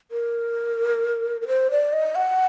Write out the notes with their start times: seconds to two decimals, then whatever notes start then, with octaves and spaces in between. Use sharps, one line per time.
0.11 A#4
1.41 A#4
1.48 C5
1.71 D5
1.93 D#5
2.15 F#5